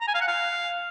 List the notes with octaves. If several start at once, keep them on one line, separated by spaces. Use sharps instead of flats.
A#5
G#5
F5
F#5
F5